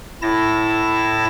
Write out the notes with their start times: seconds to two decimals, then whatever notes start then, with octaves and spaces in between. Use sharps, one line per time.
0.22 A2 E4 A5 A#6